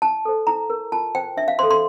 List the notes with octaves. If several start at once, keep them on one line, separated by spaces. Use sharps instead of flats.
E4 A5
A4 C5
E4 A#5
A#4
F4 A5
C5 G5
D4 E5
F5
A4 C5 C6
C6